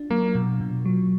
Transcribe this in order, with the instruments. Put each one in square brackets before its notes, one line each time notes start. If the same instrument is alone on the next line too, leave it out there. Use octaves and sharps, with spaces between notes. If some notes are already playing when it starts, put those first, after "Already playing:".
Already playing: [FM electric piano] D4 F4
[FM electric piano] F#3 [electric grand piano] A#3
[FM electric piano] B2
B2
F#3